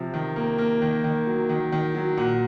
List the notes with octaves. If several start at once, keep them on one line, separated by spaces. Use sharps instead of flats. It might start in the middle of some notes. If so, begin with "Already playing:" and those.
Already playing: C3 F3
D#3
A#3
A#3
D#3
D#3
F#3
D#3
D#3
F#3
A#2 F#5